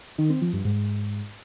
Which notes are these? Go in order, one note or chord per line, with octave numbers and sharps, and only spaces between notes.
D#3
C4
F3
G2
G#2